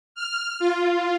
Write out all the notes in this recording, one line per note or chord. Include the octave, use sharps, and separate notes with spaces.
F6
F4